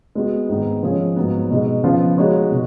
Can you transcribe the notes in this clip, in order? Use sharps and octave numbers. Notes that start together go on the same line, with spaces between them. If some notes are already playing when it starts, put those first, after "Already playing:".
G#3 B3 F#4
G#2 D#3 G#3 B3 D#4
F3 G#3 C#4 G#4 C#5
G#2 F#3 B3
B2 G#3 D#4
C#3 F3 B3 F4
G#3 D#4 F#4 C#5
B2